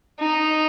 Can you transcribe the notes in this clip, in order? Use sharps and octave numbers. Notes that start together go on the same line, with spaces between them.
D#4